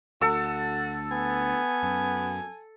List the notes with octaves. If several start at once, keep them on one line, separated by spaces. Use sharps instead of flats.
D2 F#4 A4 E6
B3 G#5
F#2